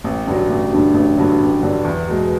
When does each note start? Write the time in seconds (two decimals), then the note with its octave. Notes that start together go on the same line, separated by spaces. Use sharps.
0.04 A1
0.27 G2 D3 F#3
0.50 A1
0.72 G2 D3 F#3
0.94 A1
1.17 G2 D3 F#3
1.40 A1
1.62 G2 D3 F#3
1.85 E2
2.08 B2 G#3